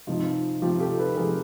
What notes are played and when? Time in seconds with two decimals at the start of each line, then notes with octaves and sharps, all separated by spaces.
0.07 C3 F3 D#4 F4
0.62 C3 F3 F4 G4
0.80 G4 A4
0.99 A4 B4
1.16 C3 F3 G#4 A#4